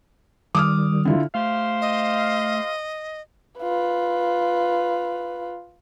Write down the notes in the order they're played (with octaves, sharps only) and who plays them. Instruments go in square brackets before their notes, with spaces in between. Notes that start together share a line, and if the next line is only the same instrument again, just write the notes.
[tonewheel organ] D#3 G3 [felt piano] D6 D#6 F6
[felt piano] D3 E4 F4
[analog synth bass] A3 [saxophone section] G4 C5 F5
[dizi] D#5
[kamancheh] F4 B4